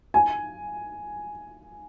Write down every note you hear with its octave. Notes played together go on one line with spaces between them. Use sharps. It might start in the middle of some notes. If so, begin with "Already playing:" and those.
G#5